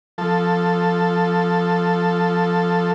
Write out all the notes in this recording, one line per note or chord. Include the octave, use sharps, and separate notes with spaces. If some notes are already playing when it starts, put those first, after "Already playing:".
F3 A4